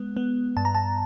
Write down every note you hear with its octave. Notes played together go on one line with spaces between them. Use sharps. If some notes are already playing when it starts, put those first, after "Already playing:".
Already playing: G#3 B3
B3
G2 A5
A#5
A5